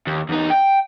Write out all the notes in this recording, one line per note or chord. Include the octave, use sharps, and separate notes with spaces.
D#2
E2 D#4
G5